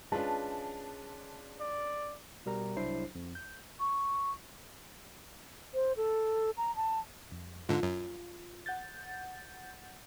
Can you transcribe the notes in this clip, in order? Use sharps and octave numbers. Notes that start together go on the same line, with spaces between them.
G#3 C#4 D4 F4 B4 A5
D5
B2 G3 A#4 A#5
C2 F#3 D4 E4 C5 C7
F2
G6
C#6
C5
A4
A#5
A5
F2
G#2 D3 F4
F#2
F#5 G6 A6